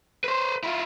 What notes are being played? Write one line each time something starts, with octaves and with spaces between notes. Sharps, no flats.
B4 C5
E4 F4